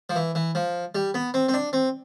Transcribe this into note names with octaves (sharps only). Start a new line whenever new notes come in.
F3
E3
E3
F3
G3
B3
C4
C4
D4
C4